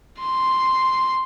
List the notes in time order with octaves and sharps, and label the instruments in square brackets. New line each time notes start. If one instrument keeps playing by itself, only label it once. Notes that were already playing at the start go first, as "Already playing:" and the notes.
[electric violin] C6